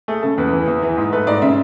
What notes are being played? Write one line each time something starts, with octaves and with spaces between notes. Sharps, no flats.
A3 G#4
C#3 A4
E2 B4
E3
E2
E3
G#2
A3 B4
G#2 D5
C#3 E5